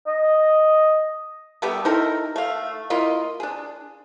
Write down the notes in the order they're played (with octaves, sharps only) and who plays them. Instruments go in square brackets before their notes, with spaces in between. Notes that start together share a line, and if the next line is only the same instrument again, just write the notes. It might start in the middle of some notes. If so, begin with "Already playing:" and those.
[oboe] D#5
[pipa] G3 A3 B3 G4
D#4 E4 A4 A#4
A3 F5
A#3 E4 F4 D#5
D4 G#4